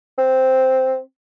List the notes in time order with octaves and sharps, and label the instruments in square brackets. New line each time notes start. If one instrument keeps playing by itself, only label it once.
[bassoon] C4